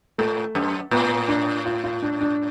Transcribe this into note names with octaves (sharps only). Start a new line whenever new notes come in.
A2 A3
F#2
A2 B3
D4
F4
F4
D4
D4